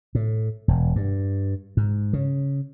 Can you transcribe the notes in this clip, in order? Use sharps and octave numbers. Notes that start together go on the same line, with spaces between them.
A2
E1
G2
G#2
C#3